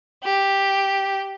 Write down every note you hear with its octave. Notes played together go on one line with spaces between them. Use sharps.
G4